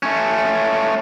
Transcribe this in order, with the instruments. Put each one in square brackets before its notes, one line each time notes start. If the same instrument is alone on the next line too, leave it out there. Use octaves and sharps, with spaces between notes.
[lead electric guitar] A3 C#4